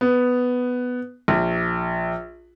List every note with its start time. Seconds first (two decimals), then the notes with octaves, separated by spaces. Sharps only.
0.01 B3
1.28 A#1